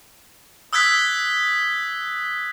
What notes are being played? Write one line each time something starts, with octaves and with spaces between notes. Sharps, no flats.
D#6 E6 F#6 G#6 B6